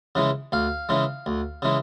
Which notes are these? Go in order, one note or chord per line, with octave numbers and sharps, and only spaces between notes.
C#3 E3 G#3
D2 F5
C#3 E3 G#3
D2
C#3 E3 G#3